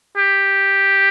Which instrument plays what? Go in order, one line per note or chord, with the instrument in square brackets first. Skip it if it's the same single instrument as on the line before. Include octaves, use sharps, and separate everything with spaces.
[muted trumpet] G4